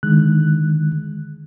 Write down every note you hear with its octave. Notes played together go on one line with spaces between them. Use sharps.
D3 D#3 G#3 F#6